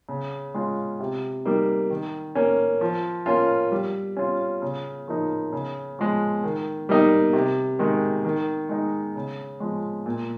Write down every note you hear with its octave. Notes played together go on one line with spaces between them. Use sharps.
C#3
G#3 C#4 F4
C3
G3 A#3 D#4
D#3
A#3 C#4
F3
A#3 C#4 F4
G3
C#4 F4
C#3
F3 A#3 D#4
C#3
F3 G#3
D#3
G3 A#3 D#4
C3
D#3 G#3
D#3
G#3 D#4
C#3
F3 G#3
A#2